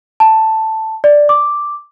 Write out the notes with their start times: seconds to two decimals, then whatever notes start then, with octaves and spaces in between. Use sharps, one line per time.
0.20 A5
1.04 D5
1.29 D6